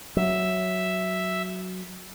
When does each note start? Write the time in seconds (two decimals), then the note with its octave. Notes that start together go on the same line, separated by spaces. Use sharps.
0.17 F#3 E5